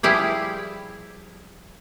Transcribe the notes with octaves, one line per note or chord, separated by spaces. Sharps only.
F3 G3 E4 G4 G#4